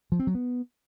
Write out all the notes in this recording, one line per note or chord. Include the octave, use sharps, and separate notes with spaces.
F3
C4
F#3
B3